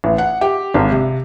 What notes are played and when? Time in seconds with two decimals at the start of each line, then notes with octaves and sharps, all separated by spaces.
0.04 A1
0.18 F#5
0.41 G4
0.74 G#1
0.91 C3